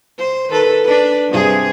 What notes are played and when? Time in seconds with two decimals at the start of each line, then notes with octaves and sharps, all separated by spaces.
0.18 C5
0.49 D#3 A4 B4
0.84 D4 B4
1.29 G2 C3 G#4